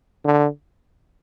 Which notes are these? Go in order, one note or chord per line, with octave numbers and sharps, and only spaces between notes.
D3